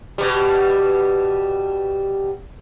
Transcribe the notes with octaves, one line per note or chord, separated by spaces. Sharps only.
B2 G3